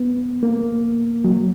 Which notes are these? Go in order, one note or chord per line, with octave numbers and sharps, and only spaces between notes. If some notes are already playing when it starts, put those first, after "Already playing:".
Already playing: B3
A#3
F#3